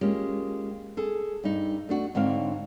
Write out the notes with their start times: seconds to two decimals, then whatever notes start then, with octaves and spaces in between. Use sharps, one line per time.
0.01 G#3 A#3 C#4 F4 G4
0.97 G#4 A4
1.44 G2 D#4
1.89 A3 D4 F#4
2.15 G#2 D3 C4 D4 C#5 F5